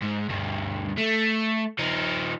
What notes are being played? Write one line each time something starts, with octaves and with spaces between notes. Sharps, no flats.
G#2
D2 G2
A3
F3 D#4